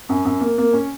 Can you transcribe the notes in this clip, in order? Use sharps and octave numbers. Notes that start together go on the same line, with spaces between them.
F#2
F#2
A#3
A#3
C#4